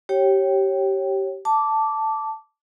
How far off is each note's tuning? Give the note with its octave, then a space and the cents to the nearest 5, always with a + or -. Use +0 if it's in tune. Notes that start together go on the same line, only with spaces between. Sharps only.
G4 -20 C#5 -20 G5 -10
A5 +0 D6 -10